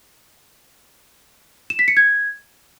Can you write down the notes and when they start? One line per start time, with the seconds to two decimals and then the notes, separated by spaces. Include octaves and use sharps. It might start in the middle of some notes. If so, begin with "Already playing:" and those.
1.70 E7
1.79 B6
1.88 C#7
1.97 G#6